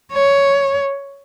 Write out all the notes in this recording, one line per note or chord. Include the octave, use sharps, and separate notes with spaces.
C#5